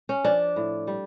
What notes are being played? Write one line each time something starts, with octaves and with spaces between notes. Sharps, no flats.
C#4
F3 D4
A2
G3